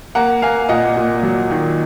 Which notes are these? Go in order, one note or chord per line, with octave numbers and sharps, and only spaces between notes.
A#3 F#5 A#5
A#3 F5 G#5
A#2 D#5 F#5
A#2
F#3
D#3